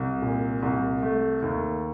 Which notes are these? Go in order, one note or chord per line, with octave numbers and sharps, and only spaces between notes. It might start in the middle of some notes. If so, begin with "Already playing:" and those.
Already playing: C2
A#2
C2
A3
D#2